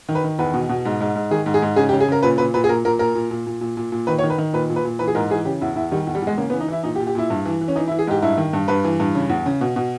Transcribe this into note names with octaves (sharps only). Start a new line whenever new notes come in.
D#3
B4
D#3
E2 B4
B2
B2
G#2
G#2
G#2
D#3 G#4
G#2
G#4
G#2
C#3 G#4
G4
C#3
G#4
C#3 A#4
A#2 B4
A#2 B4
A#2 B4
G#4
A#2 A#4
A#2 A#4
A#2 A#4
A#2
A#2
A#2
A#2
A#2
A#2
D#3 B4
C#5
D#3
B4
D#3
A#2 B4
A#2
B4
A#2
E3 B4
G#4
G#2 A#4
E3 G#4
C#3 G4
E2 E4
E2 E4
D#3 G3
E2
G3
E2 G#3
C#3 A#3
B3
E3
D#4
E3 E4
A#2 D#4
G4
A#2
G4
A#2 E4
G2
E3
E3
C#4
E3 D#4
E4
E3
G#4
G#2 G4
G2 E4
D#3
G2
G2 B4
E3
G2
C#3
E2
C#3
B2
B2